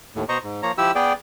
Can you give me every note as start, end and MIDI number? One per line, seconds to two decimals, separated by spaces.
0.16 0.24 39
0.16 0.24 45
0.29 0.38 47
0.29 0.38 72
0.29 0.38 75
0.29 0.38 82
0.29 0.38 85
0.44 0.61 44
0.63 0.72 53
0.63 0.72 58
0.63 0.72 73
0.63 0.72 82
0.78 0.92 53
0.78 0.92 64
0.78 0.92 67
0.78 0.92 88
0.95 1.13 59
0.95 1.13 68
0.95 1.13 74
0.95 1.13 79